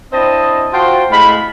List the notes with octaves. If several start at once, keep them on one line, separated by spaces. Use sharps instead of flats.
C4 D4 E4 C5 D#5 A5
F4 F#4 C5 G5 A5
A2 C3 G#3 F5 B5